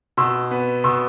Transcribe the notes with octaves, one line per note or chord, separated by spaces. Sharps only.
B2 C6 E6
B3
B2 C6 E6